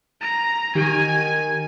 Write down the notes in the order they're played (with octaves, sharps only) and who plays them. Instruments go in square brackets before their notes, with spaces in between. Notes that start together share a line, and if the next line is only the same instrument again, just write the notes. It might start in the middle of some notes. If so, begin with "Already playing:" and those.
[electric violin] A#5
[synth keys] D#3 [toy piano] G4 [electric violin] G#5